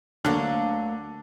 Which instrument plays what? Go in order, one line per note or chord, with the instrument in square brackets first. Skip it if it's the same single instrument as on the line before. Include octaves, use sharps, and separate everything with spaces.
[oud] D2 F#3 A#3 [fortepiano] D3